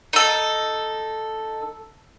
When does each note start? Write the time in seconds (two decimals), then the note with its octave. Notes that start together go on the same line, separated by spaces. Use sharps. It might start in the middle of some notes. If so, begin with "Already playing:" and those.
0.13 D#4 A4